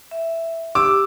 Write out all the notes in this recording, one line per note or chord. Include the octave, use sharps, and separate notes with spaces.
E5
G4 D6 E6